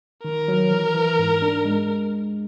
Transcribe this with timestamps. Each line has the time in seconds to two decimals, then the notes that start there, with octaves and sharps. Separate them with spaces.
0.24 D#3 A#4
0.48 F#3
0.71 E3
0.95 E3
1.19 G#2
1.42 D4
1.65 G#3